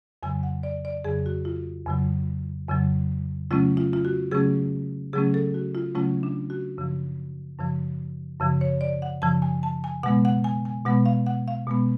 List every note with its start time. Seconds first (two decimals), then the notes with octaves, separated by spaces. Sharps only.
0.23 F2 C#3 F#3 G#5
0.43 F#5
0.63 D5
0.85 D5
1.04 F2 C#3 F#3 G#4
1.26 F#4
1.45 F4
1.86 F2 C#3 F#3
2.69 F2 C#3 F#3
3.50 C#3 F#3 A3 C#4 F4
3.77 F4
3.93 F4
4.05 F#4
4.31 C#3 F#3 A3 C#4 G#4
5.13 C#3 F#3 A3 C#4 G#4
5.34 A4
5.54 F#4
5.75 F4
5.95 C#3 F#3 A3 C#4 F4
6.23 D4
6.50 F#4
6.78 F#2 C#3 F3
7.59 F#2 C#3 F3
8.40 F#2 C#3 F3
8.61 C#5
8.81 D5
9.02 F#5
9.22 F#2 C#3 F3 A5
9.42 G#5
9.63 A5
9.84 G#5
10.03 B2 G#3 B3 F#5
10.25 F#5
10.44 G#5
10.65 G#5
10.85 B2 G#3 B3 F#5
11.06 F5
11.26 F#5
11.48 F5
11.67 B2 G#3 B3